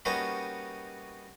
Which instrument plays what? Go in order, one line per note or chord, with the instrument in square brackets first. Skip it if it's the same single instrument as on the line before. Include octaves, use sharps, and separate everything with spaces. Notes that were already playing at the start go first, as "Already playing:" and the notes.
[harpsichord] G3 A#3 B3 C#4 D#4 F#4